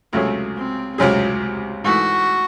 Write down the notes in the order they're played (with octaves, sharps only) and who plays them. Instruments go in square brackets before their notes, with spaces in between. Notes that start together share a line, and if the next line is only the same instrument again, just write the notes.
[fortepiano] C#2 C3 F#3 C#4 G#4 [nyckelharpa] A3
[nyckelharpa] C4
[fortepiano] C#2 C3 F#3 C#4 G#4
[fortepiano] G#2 E3 A3 [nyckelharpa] F#4